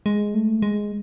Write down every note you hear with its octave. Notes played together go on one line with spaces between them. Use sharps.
G#3
A3
G#3